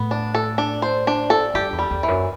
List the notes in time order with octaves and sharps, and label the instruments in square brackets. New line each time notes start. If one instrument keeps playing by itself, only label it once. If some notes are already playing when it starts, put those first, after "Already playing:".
Already playing: [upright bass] A2 [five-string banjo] B3
[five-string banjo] D4
A4
D4
C5
D4
A4
[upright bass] G2 [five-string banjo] G4
[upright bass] E2
[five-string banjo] G3
[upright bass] E2
[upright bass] F#2 [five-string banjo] E3